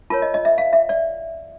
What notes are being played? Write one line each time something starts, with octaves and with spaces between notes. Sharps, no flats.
F4 A#4 C#5 A5
D#5
D#5
E5
F5
E5
D5